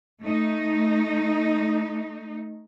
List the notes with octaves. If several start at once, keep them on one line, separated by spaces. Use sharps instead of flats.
A3 D#4